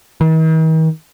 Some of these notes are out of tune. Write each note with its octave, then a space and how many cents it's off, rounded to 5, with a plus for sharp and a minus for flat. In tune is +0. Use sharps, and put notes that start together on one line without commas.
D#3 +45